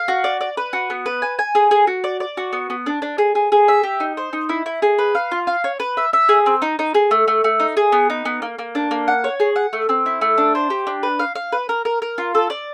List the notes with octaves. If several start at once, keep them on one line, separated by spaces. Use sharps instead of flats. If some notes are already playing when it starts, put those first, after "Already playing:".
Already playing: F5
F#4
D5
D5
B4
F#4
B3
B4
G#5
G#5
G#4
G#4
F#4
D5
D5
F#4
B3
B3
D4
D4
G#4
G#4
G#4
E5
G4
D#4
C5
D#4
E4
E4
G#4
B4
F5
F4
F5
C#5
B4
E5
E5
G#4
C4
D#4
D#4
G#4
A3
A3
A3
D#4
G#4
B3
D#4
B3
A#3
A#3
D4
A#3
F#5
C#5
G#4
F#5
A3
C4
E4
A3
D4
C5
G4
D4
B4
F5
F5
B4
A#4
A#4
A#4
F4
A4
D5